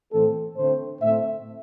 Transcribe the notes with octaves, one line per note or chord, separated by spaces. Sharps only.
A2 E3 A3 C4 A4
D3 A3 C4 C5
A2 A3 C4 E5